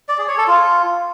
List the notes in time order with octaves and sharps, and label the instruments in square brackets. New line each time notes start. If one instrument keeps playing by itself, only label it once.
[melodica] D5
G#4
C#5
A4
F4